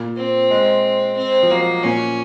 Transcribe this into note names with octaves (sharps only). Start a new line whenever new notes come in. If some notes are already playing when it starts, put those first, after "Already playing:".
Already playing: A#2
C4
G#3
C4
F3
F#3 A#3
A#2 C#4